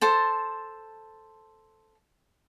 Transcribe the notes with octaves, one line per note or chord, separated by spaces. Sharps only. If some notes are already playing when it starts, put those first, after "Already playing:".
A4 C5 A5